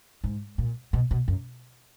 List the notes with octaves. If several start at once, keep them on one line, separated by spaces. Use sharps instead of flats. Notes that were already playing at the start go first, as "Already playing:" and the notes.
G#2
A#2
B2
B2
F#2